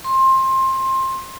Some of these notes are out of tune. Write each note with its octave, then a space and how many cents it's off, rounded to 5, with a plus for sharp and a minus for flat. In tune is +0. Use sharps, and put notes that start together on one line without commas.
C6 +20